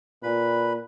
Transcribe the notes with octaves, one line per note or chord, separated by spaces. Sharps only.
A#2 B4 B5